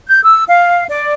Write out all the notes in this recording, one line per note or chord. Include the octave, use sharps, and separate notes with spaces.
G6
E6
F5
D5